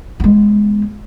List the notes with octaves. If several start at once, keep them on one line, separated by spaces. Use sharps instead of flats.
G#3 B3